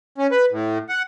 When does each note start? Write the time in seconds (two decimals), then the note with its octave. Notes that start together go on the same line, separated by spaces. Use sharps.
0.18 C#4
0.31 B4
0.51 A2
0.89 F#5